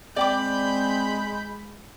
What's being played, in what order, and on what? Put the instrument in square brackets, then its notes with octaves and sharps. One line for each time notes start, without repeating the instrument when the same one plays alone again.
[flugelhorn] G#3 [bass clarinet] C4 [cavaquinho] D5 G5 D6 [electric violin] B5 G6